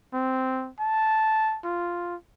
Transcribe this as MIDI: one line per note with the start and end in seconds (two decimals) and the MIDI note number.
0.13 0.70 60
0.79 1.58 81
1.64 2.15 65